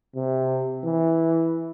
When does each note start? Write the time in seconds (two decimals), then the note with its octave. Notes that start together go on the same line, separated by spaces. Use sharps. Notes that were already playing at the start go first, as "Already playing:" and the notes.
0.16 C3
0.84 E3